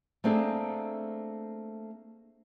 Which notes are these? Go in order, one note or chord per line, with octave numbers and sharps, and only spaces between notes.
A3 A#3 C4 D4 G#4 A4